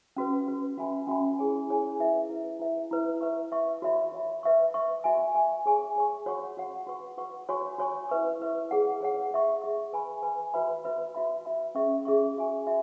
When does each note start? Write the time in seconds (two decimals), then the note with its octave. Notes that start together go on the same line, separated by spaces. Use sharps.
0.17 C#4 F#4 B4
0.47 C#4 F#4 B4
0.78 C#4 F#4 E5 G#5 B5
1.07 C#4 F#4 E5 G#5 B5
1.38 E4 G#4 C#5 G#5
1.68 E4 G#4 C#5 G#5
2.00 E4 B4 E5
2.29 E4 B4 E5
2.60 E4 B4 E5
2.91 E4 B4 E5
3.21 B4 E5 C#6
3.52 B4 E5 C#6
3.82 F#4 C#5 E5 B5
4.12 F#4 C#5 E5 B5
4.43 B4 E5 C#6
4.74 B4 E5 C#6
5.04 F#4 E5 G#5
5.35 F#4 E5 G#5
5.66 G#4 C#5 G#5 C#6
5.96 G#4 C#5 G#5 C#6
6.26 F#4 C#5 F#5 C#6
6.57 F#4 C#5 F#5 C#6
6.87 F#4 B4 F#5 C#6
7.18 F#4 B4 F#5 C#6
7.49 F#4 C#5 G#5 C#6
7.78 F#4 C#5 G#5 C#6
8.09 E4 B4 E5 C#6
8.40 E4 B4 E5 C#6
8.71 G#4 C#5 F#5
9.01 G#4 C#5 F#5
9.31 G#4 E5 C#6
9.62 G#4 E5 C#6
9.93 B4 G#5 B5
10.23 B4 G#5 B5
10.54 F#4 B4 E5 B5
10.84 F#4 B4 E5 B5
11.15 F#4 E5 B5
11.45 F#4 E5 B5
11.75 C#4 G#4 E5 C#6
12.05 C#4 G#4 E5 C#6
12.37 F#4 E5 G#5 C#6
12.67 F#4 E5